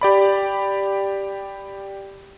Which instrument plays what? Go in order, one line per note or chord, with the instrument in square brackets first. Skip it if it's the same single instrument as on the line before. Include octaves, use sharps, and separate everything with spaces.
[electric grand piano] G4 D5 B5